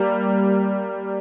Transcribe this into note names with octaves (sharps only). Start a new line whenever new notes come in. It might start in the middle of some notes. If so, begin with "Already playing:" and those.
Already playing: G3 A#3